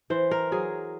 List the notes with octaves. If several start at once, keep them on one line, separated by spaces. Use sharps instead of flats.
E3 C5
A#4
F#3 G#4